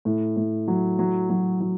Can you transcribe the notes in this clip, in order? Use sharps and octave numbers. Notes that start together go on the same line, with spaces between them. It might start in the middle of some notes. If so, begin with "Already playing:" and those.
A2
A2
F#3
F#3
F#3
F#3